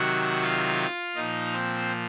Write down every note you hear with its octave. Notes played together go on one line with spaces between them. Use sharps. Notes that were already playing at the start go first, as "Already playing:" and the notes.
Already playing: C3 D#3 F#3 F#4 F#5
F4 F5
A#2 F3 D#4 D#5
C4 C5